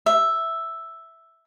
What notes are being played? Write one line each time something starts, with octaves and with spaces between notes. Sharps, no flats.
E5